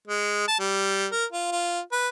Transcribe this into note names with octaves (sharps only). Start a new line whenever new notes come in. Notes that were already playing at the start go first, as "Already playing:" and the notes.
G#3
A5
G3
A#4
F4
F4
B4